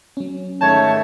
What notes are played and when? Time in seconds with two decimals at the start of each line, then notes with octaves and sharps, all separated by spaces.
0.17 F#3 C#4
0.61 G#2 D#3 A3 C#5 A5 G6